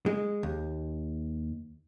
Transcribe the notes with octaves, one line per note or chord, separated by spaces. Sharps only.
G#3
D#2